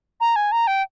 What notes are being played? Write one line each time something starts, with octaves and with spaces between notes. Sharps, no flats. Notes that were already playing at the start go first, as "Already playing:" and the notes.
A#5
G#5
A#5
G5